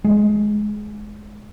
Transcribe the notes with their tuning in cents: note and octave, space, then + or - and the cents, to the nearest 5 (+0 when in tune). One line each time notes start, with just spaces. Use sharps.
G#3 +15